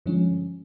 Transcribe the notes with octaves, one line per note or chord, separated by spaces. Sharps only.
G2 D3 F3 G#3 C#4